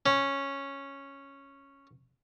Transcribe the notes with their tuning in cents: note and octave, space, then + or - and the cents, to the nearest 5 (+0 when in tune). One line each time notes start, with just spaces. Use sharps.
C#4 -5